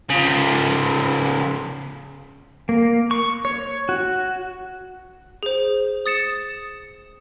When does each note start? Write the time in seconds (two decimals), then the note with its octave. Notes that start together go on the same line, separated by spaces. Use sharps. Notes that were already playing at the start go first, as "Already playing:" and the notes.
0.10 C#3 F3
2.69 A#3
3.11 C#6
3.45 C#5
3.89 F#4
5.43 G#4 C5
6.06 D#6 A6 C#7 E7